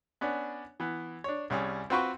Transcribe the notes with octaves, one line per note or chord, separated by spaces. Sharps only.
B3 C#4 D4
E3 B3
D4 C#5
C2 G3 C#4 G#4
C4 F4 F#4 B4 G5 C#6